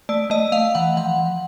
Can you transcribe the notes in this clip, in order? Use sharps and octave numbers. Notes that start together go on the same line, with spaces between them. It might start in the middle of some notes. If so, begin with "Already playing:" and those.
A3 D5
A3 D#5
A3 F5
E3 F#5
F3 F#5
F3